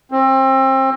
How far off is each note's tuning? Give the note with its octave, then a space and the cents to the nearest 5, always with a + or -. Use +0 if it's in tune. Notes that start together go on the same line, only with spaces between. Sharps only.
C4 +30